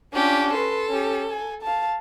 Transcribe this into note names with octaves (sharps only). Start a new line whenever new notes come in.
C#4 D4 F4 G4
A4 B4 C6
C#4 G4
G#5
F5 A5